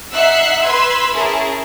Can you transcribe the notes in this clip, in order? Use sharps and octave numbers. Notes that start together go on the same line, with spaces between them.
D#4 E5 F#5 E6 F#6 C7
B4 B5 C6 E6 G#6
C#4 E4 G#4 A#4 A5